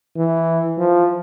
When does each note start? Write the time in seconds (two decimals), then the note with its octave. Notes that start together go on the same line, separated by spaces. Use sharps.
0.17 E3
0.78 F3